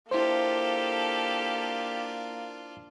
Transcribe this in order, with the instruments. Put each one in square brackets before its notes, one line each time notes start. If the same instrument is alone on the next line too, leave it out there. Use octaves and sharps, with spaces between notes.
[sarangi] A#3 [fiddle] D4 F4 [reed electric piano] E4 C5 [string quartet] G4 A4